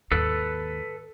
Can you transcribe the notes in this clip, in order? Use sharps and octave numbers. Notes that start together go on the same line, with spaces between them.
D#2 G#2 A4 B4